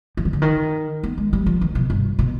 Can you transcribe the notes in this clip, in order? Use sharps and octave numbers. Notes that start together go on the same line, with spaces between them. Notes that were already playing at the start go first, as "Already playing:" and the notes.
F3
D#3
D3
D#3
B3
G#3
G3
F3
D#3
B2
G2
B2